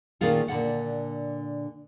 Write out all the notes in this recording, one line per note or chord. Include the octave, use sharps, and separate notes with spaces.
A#2 D#3 A3 C#4 F4 G#4
A#2 D3 F#5